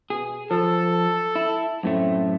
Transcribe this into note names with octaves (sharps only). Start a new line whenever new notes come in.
B2 G#4
F3 A4
E4
F#2 A2 A3 C4